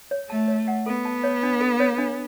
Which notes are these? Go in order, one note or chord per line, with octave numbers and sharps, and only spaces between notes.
C#5
A3 A5
C#5
F#5
B3 A4
A5
C#5
D4
A4
C#5
D4